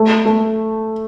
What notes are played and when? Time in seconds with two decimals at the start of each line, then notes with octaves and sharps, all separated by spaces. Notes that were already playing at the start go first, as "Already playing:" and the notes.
Already playing: A3
0.25 A3